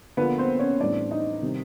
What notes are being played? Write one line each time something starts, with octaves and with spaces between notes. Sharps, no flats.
D3 F3 A#3 B3 B4
C4 C5
C#4 C#5
A2 E3 G3 C4 D4 D5
D#4 D#5
C3 D#3 G3 C4